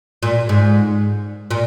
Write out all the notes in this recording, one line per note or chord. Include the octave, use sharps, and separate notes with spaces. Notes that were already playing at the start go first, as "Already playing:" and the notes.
A#2
G#2
A#2